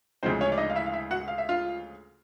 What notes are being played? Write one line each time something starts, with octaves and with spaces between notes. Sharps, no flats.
D2 C#3 F3 G#3 C4 C5
C#4 C#5
D5
D#4 D#5
F5
E4 E5
F5
E4 E5
F#4 F#5
F5
E5
F4 F5